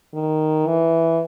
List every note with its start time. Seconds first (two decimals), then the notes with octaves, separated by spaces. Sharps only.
0.14 D#3
0.66 E3